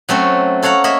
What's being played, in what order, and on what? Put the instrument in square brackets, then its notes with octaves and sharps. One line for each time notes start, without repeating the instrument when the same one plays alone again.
[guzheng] F#3 A3 C4 C#4
A4 C#5 F5 F#5 A#5
A#3 C#5 D#5 E5